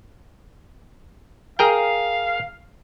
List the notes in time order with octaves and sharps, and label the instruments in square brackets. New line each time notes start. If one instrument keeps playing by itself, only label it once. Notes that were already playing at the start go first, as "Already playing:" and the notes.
[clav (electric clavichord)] G#4 A#4 G5 [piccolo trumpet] F5